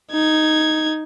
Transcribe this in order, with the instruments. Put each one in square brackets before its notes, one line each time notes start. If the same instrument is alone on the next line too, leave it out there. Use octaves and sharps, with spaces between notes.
[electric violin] D#4 G#6